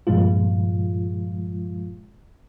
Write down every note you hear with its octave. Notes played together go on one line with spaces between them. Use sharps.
G2 A#2 F3 G#3 F4